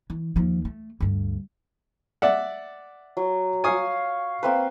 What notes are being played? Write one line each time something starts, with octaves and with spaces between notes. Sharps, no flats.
E3
D#2 F3
A3
D2 G2
D5 E5 F#5
F#3
C#5 F5 G#5 D#6
A#3 C4 B4